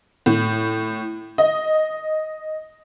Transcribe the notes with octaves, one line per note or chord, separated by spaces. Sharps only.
A2
D#5